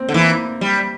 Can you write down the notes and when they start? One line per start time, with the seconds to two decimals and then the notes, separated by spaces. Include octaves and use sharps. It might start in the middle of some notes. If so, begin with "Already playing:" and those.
Already playing: A#3 C4
0.09 D3
0.14 E3 A#3
0.61 G3